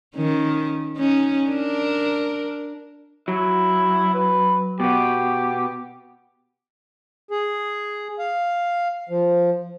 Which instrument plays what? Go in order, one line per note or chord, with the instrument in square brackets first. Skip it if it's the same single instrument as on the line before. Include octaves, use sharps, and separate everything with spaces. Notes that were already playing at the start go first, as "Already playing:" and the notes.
[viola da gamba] D#3 C#4
C#4 D#4
D4 A#4
[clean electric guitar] F#3 [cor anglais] E4
[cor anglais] B4
[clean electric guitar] B2 B3 [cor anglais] G4
[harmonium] G#4
F5
F3